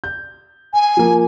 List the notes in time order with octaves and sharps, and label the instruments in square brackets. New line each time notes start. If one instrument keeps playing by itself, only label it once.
[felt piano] G6
[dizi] G#5
[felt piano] F3 A#3